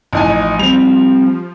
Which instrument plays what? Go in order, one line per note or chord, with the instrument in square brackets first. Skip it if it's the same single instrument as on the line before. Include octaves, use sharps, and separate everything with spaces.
[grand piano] A1 D#4 G#5 [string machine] F3
[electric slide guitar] G3 C4 [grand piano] F7